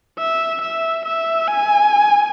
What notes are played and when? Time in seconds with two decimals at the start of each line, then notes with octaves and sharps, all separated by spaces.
0.18 E5
0.61 E5
1.05 E5
1.48 G#5